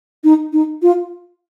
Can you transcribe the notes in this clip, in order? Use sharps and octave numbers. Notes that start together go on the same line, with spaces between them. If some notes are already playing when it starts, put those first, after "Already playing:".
D#4
D#4
F4